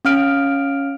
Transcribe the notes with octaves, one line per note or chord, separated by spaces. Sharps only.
C#4 F5 F6 D7